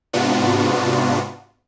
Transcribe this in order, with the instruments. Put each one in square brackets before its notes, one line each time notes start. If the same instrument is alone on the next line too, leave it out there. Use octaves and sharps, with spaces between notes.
[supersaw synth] G#2 C3 B3 D4 F4 F#4